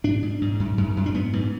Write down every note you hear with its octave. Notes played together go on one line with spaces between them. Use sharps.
G#2 D4
G#2
G#2
F#2
F#2
F#2
D4
G#2 B3
G#2